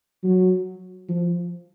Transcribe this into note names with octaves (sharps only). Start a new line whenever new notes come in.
F#3
F3